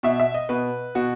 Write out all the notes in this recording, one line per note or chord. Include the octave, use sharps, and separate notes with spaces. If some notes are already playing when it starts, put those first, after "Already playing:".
B2 E5
E5
D#5
B2 B4
B2 F#4